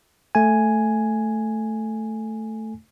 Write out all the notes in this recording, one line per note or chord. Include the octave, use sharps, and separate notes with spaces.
A3 G#5